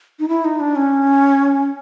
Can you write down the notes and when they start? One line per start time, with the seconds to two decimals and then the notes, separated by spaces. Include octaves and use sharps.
0.19 D#4
0.28 E4
0.45 D#4
0.60 D4
0.76 C#4